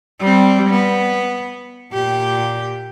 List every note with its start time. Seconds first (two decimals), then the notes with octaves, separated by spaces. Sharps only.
0.20 G3 C4
0.69 B3
1.93 A#2 G4